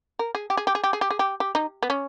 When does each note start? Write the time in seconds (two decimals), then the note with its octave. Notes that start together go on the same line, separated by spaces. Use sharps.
0.19 A#4
0.35 G#4
0.50 G4
0.57 G#4
0.67 G4
0.75 G#4
0.84 G4
0.93 G#4
1.01 G4
1.10 G#4
1.19 G4
1.40 G4
1.55 D#4
1.83 B3
1.90 C#4